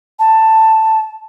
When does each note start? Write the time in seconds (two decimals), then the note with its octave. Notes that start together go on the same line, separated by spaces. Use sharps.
0.19 A5